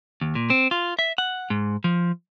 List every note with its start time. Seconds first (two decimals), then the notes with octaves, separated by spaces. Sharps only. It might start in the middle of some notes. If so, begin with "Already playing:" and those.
0.21 D#2
0.35 A#2
0.50 C4
0.71 F4
0.99 E5
1.18 F#5
1.50 G#2
1.84 F3